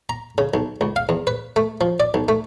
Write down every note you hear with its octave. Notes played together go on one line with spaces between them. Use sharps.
A#5
C#3
B1
C#2
F5
E2
B4
A3
F3
D5
B1
A3